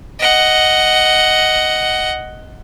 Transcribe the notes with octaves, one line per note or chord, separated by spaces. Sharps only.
D#5 F#5